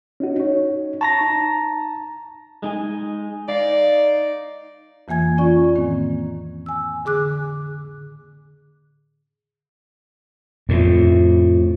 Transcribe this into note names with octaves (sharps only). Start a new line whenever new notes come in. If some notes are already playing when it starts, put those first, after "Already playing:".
C#4 D#4 F#4
D#4 C#5
A5 A#5 C#6 A#6
D#4
G#3 D#4 G#5
D#4 D5 F5
F2 E3 A#3 G#5 G#6
C#4 F4 D5 C#6
A2 D#3 A#3 C4
G#5 E6
D3 G#4 D6 F#6
F2 A2